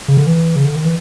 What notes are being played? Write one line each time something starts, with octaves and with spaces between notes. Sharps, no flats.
C#3
D3
E3
C#3
D3
D#3
E3